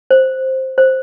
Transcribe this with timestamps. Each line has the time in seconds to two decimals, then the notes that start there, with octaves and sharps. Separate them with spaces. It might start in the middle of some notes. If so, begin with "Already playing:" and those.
0.11 C5
0.78 C5